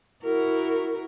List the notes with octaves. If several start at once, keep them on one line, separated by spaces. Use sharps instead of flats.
E4 F#4 A#4